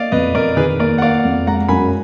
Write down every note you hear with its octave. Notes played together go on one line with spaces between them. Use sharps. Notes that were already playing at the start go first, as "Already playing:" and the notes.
Already playing: A#3 D5 D#5 F5
F2 B4 D#5
F2 A#4 D5
D#3 G#4 B4
A#3 A#4 D5
F#5
A#3 D5 F5
F2
G#3 F#5 A#5
F#2 G#5 B5